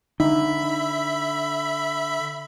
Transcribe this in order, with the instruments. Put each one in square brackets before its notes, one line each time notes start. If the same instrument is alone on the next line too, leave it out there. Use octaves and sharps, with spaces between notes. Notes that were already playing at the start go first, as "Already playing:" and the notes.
[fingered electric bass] D3 [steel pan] D#4 [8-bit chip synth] E5 B5